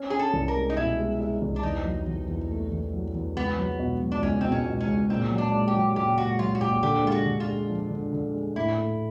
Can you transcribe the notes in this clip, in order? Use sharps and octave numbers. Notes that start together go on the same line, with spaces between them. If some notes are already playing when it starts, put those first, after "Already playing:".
Already playing: C#4
C#4 G#4
A4
C2
A#4
G#3
D#4
B2 E4
G#3
G#3
C2
D4
E2 D#4
F#3
E2
E2
A3
E2
F#3
E2
C#2 B3
F#3
B2
F#3
D4
C#2 C#4
B2 C4
C#4
B2
C#4
C#2
A#2 C4
F#3
D4
A#3
G4
F#3
A#2 G4
A#2 F#4
F#3 F4
F#4
A#2 G4
D3 G4
G#3 F4
F#4
D3
F4
G#3
F3
D3
D3
G#3
A2 E4
A3